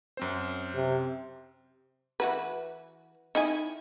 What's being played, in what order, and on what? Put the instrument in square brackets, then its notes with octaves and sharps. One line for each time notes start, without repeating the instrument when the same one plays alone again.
[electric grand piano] F#2 C4 C5
[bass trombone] C3
[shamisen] E3 F#4 B4
D#4 E4 G#5